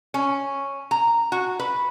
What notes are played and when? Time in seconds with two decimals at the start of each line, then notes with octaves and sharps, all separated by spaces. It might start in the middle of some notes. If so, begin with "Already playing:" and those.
0.14 C#4
0.91 A#5
1.32 F#4
1.59 B4